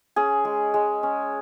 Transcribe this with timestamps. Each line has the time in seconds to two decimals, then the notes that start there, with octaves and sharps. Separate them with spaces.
0.16 C#4 G#4
0.45 G#3
0.74 G#3
1.03 C#4